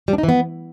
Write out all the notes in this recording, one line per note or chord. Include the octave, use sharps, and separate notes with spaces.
G3
D4
D#4
E3
B3